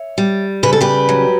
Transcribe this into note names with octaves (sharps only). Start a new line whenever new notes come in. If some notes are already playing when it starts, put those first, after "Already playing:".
Already playing: C#5 E5
G3
C#3 B4
A4
G4 B4
F#3